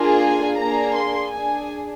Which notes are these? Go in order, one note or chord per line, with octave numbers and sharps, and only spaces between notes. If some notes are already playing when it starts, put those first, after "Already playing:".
Already playing: A#3 D4 F4 G#4
G#5
A#3 D4 G#4 A#5
C6
D4 G#4 G#5